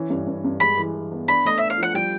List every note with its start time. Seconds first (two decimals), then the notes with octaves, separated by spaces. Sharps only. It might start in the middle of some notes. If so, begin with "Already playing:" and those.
Already playing: E3 C#4
0.10 G2
0.27 G2
0.44 G2
0.60 G#3 B5
0.77 E3
0.95 E3
1.12 B3
1.28 D4 B5
1.45 A3 D#5
1.58 D4 E5
1.70 F5
1.78 F3 F#5
1.94 G3 G5